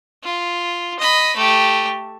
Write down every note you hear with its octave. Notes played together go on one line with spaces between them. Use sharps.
F4
D#5 B5
A3 G4